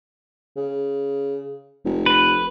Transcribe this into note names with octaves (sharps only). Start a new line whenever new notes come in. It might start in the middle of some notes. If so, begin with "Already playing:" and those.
C#3
F1
B4